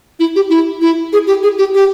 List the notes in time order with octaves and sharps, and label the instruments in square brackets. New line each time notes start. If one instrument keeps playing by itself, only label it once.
[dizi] E4
G4
E4
E4
G#4
G4
G#4
G4
G4